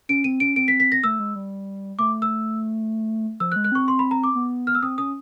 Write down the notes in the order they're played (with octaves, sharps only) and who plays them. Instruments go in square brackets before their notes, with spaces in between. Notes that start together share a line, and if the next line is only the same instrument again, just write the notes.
[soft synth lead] C#4 [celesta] D7
[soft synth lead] C4 [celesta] D#7
[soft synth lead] C#4 [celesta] D7
[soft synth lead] C4 [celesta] D7
[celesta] B6
B6
A#6
[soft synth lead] A3 [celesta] E6
[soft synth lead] G#3
G3
[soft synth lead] A3 [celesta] D6
[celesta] E6
[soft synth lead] F3 [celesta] E6
[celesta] F#6
[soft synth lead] G#3
[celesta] F#6
[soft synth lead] C4 [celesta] C#6
[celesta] C6
B5
A#5
D6
[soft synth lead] B3
[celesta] F6
E6
[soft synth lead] C4 [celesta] D#6
[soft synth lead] C#4 [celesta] D#6